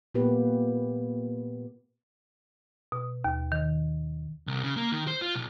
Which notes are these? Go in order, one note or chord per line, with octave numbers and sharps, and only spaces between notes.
A#2 A#3 B3 G4 B4
B2
D#2
D#3
C2
C#3
A#3
D#3
C5
F4
B1